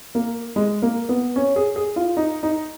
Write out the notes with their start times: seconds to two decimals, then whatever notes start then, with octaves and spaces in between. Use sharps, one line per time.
0.15 A#3
0.56 G#3
0.82 A#3
1.09 B3
1.36 C#4
1.56 G#4
1.76 G#4
1.96 F4
2.17 D#4
2.43 D#4